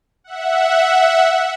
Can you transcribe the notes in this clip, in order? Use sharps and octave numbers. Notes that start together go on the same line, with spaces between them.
E5 F#5